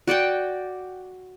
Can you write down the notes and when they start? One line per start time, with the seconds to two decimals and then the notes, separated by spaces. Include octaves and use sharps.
0.07 F#4 D5 F#5 G5